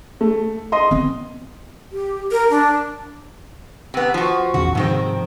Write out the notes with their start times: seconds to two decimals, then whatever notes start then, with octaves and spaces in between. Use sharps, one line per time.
0.21 A3
0.72 D#5 C6
0.91 B3 C4
1.92 G4
2.32 A#4
2.50 D4
3.94 C3 B3
4.14 F3 F#4
4.54 A#1 E2 C#3 F#4
4.75 F2 G#2 C3 D#3 F3 C4